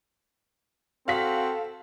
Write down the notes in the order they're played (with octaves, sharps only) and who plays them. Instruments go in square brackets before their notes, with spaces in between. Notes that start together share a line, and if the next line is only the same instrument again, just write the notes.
[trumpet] C4 [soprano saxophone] F#4 [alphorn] A4 [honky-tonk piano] F5 B6